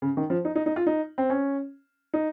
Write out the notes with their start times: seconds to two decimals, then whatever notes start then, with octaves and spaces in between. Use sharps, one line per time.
0.02 C#3
0.17 D#3
0.30 F3
0.45 D#4
0.56 D#4
0.66 D#4
0.76 F4
0.87 D#4
1.18 C4
1.30 C#4
2.14 D#4